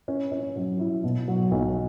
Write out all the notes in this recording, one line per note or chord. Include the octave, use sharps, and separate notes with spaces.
C#4
C#4
F#3
E4
B2
F#3
B1